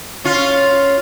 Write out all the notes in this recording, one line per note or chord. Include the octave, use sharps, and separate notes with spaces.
C#4 F4